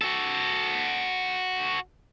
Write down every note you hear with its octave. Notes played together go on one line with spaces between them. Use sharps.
F#4 A4